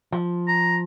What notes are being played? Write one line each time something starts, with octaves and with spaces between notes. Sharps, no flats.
F3
A#5